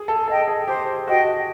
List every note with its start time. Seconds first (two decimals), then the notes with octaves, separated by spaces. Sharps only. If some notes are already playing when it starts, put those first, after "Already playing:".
Already playing: G#4
0.08 A4
0.28 A4 D#5 G5
0.48 G#4
0.68 G4 C5
1.07 F#4 D#5 G5